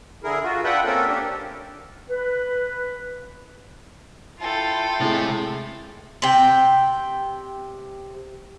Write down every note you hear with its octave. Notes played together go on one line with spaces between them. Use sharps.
D3 E4 G#4 A#4
F4 F#4
D4 F4 B4 E5 F#5 G5
A#3 C4 C#4 A4 A#4
D4 G4
B4
E4 F4 A4 G5
A2 C3 G#3
C3 G5